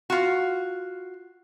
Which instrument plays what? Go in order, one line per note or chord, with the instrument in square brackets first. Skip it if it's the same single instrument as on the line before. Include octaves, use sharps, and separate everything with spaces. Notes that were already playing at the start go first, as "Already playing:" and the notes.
[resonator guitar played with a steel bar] F4 F#4